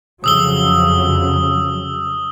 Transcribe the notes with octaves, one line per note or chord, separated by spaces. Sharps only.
F2 C#3 F#3 D#6 E6 G7